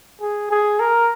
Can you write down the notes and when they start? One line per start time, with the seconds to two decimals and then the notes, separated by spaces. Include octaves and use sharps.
0.21 G#4
0.51 G#4
0.80 A#4